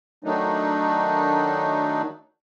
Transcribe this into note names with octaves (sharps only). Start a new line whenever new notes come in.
D#3 F#3 A3 D4 D#4